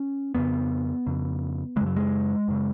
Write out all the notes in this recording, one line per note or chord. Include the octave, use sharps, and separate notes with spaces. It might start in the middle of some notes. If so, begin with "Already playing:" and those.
Already playing: C#4
F2 C#3 B3
F2 C#3
C#3 G#3
F#2
F#3
G#3
F#2 C#3